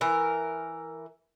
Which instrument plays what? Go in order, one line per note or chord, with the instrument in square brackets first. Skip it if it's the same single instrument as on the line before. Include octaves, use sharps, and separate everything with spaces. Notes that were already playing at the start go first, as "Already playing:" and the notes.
[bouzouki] E3 A#4